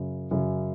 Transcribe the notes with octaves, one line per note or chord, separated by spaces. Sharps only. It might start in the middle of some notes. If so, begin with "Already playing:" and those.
Already playing: F#2 C#3
F#2 C#3